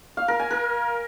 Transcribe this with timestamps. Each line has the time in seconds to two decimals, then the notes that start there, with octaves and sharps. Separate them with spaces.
0.17 F5
0.28 A#4
0.39 G#5
0.51 A#4